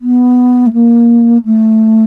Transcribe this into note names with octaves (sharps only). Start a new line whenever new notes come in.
B3
A3
A#3
A3